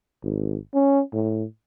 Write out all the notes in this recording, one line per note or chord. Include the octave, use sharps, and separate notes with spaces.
G#1
C#4
A2